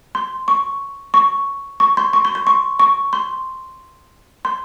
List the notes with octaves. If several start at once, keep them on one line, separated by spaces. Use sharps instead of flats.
C6
C#6
C#6
C#6
C6
C#6
C6
C6
C#6
C#6
C6
C6